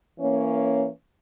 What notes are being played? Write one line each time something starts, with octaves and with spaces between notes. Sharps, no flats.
E3 A#3 C#4